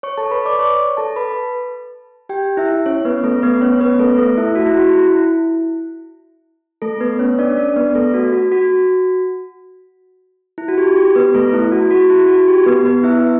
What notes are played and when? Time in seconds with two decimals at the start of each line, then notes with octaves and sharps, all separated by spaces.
0.03 C#5 C#6
0.18 A4 A5
0.31 B4 B5
0.46 D5 D6
0.59 C#5 C#6
0.97 A4 A5
1.16 B4 B5
2.29 G4 G5
2.57 E4 E5
2.86 C#4 C#5
3.05 B3 B4
3.23 A3 A4
3.42 B3 B4
3.61 C#4 C#5
3.80 B3 B4
3.99 A3 A4
4.18 A3 A4
4.37 E4 E5
4.55 F#4
4.66 E4
4.74 F#4
4.93 E4
5.12 E4
6.82 A3 A4
7.00 B3 B4
7.19 C#4 C#5
7.39 D4 D5
7.57 D4 D5
7.76 B3 B4
7.95 A3 A4
8.14 F#4
8.32 F#4
8.52 F#4
10.58 E4
10.68 F#4
10.78 G4
10.97 G4
11.15 B3 B4
11.34 A3 A4
11.53 E4
11.72 F#4
11.91 F#4
12.10 E4
12.28 F#4
12.48 G4
12.66 B3 B4
12.85 B3 B4
13.03 E4 E5